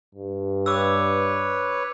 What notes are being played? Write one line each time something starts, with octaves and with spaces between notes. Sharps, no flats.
G2
B4 C#5 D6 E6